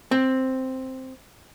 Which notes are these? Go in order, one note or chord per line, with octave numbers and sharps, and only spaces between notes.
C4